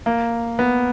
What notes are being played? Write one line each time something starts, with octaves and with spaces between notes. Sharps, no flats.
A#3
B3